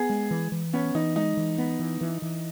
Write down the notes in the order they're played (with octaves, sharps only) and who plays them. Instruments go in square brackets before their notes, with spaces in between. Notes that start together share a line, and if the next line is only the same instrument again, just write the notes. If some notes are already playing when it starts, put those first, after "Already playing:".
Already playing: [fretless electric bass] B3 [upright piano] G#4
[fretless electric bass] G#3
E3
E3
[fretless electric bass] B3 [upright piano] C#4
[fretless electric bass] E3 [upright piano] D#4
[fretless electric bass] G#3 [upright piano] D#4
[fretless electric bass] E3
B3
E3
E3
E3